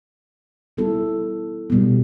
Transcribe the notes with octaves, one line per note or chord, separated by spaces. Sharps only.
G3 B3 E4 A4
B2 G3 B3